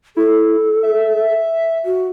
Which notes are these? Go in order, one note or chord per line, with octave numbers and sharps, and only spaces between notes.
E4 A4
E5
F#4